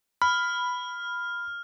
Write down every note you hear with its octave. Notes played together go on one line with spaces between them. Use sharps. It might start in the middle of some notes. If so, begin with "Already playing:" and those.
B5 F6